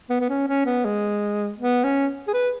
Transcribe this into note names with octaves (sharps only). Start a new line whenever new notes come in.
B3
B3
C#4
C#4
B3
G#3
B3
C#4
G#4
B4